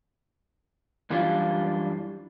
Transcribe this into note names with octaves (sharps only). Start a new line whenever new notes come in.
F#2 E3 G3 D4 F4